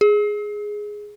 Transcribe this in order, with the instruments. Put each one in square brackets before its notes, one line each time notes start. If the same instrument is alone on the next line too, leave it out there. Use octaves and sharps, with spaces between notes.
[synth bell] G#4